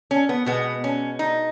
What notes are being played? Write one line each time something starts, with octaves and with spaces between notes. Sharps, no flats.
C#4
B3
B2 G#3 B3
C#4
D#4